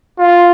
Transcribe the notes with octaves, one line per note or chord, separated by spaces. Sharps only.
F4